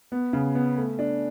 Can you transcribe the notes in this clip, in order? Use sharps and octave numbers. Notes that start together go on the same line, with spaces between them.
B3
C#3
B3
A3
D4